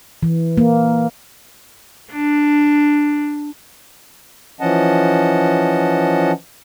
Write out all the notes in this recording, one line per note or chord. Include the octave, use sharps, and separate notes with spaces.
E3
A#3
D4
E3 F3 C#4 D#5 F#5 A5